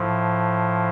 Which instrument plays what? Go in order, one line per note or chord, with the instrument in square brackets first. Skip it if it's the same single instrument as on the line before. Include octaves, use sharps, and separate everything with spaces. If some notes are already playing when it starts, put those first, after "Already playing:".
Already playing: [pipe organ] A2 F3